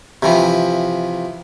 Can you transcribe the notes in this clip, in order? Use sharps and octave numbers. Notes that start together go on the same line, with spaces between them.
C3 E3 F3